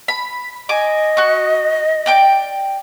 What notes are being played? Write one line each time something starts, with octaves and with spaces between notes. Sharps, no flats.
B5
D#5 G#5 D6
F#4 C#6
D5 G5 D6